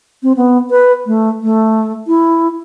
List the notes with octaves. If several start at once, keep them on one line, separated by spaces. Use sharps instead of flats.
C4
B3
B4
A3
A3
E4